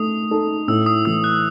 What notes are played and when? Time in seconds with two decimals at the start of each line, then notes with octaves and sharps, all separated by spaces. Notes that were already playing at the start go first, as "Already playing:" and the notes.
Already playing: A3 D#4 D#6
0.31 D#4 A4
0.68 A2 E6
0.86 D#6
1.05 E3 A3 E6
1.24 F#6